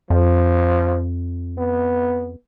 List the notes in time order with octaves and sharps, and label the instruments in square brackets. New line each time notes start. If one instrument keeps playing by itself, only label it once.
[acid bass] F2 [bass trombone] F3
[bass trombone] B3